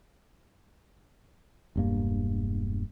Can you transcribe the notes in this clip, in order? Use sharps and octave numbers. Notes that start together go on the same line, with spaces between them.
E1 G2 A#3